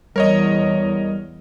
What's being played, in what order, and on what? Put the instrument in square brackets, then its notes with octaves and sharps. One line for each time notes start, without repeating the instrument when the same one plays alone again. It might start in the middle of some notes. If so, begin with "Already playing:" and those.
[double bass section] E2 [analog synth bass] G3 [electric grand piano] A#4 C#5 D#5